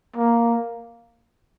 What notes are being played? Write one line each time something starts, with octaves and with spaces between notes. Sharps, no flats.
A#3